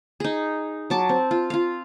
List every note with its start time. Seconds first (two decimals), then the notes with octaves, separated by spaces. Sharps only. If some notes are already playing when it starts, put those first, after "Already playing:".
0.20 D#4 G#4
0.90 F#3 A5 D6
1.09 C4
1.31 F4
1.50 F4 F5